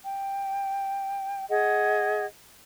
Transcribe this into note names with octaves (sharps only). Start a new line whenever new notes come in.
G5
G#4 D#5 F#5